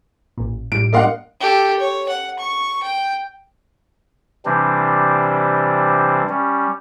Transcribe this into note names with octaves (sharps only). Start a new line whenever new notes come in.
A1 A#2
A2 G3 D7
A#3 D5 D#5 F5 F#5 C6
G4 A4
C#5
F#5
C#6
G5
C3 E3 G3 C4 D4
G3 C#4